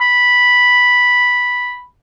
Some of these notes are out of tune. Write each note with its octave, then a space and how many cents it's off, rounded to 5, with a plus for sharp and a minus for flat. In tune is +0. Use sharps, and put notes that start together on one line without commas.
B5 -5